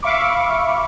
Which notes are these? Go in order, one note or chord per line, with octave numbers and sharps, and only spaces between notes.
E5 F5 B5 C#6 D6